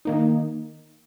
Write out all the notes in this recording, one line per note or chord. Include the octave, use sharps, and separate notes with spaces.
D#3 A#3 D#4